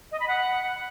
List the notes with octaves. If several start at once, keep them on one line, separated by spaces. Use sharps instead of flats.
D#5
B5
F#5